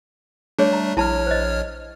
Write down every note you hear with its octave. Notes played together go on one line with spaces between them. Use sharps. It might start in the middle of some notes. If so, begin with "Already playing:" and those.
G3 A3 D4 G#4 C#5
A#5
A#1 E4 C#5 A5 B5 F6
C5 D#5